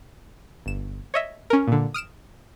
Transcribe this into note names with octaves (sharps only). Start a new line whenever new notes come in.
G1 E7
C#5 D#5 E5
C#4 A#4
A#2 D3
D#6 F6 D7 E7